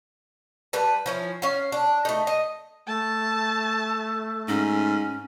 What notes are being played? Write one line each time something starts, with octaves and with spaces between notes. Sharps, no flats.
G3 B4 A5
F3 C#4 E4
C#4 F5
D4
A3 D#4
D#5
A3 A5
G#2 C#4